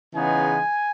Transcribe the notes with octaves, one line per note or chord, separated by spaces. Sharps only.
C#3 E3 G#3 B3 D#4 G#5